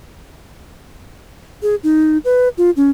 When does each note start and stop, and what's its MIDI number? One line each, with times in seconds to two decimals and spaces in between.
1.62 1.75 68
1.83 2.18 63
2.25 2.48 71
2.58 2.71 65
2.77 2.91 61